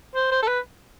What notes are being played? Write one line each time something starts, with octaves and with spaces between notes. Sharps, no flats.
C5
C5
A4
B4